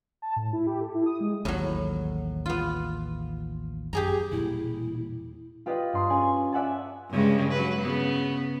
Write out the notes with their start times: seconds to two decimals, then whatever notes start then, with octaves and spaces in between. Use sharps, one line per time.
0.22 A5
0.36 A2
0.53 E4
0.67 G4
0.80 A4
0.94 E4
1.06 D#6
1.20 G#3
1.45 A1 D#2 A2 F#3
2.46 B3 F4
3.93 F#2 G4 G#4 A#5
4.32 E1 A#2 G3 E4
5.66 F4 G4 B4 D5 D#5
5.93 G2 C6 D#6
6.10 C#4 G#4 D5 G#5
6.52 D5 E5 F#5 G#5 A5
7.11 G2 C#3 G#3
7.52 F#3 B4
7.82 C#3 B3